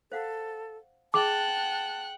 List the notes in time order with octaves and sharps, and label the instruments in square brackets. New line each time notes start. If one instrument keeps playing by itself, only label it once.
[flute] A4 [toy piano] C5 F5 F#5
[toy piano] G#4 D#5 [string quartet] F#5 G5 F#6 [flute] A5 [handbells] D6